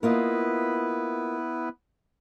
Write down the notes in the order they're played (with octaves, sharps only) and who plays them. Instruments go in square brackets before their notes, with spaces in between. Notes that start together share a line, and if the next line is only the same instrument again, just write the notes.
[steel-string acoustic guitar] A#3 F4 D#5 [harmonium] B3 E4 B4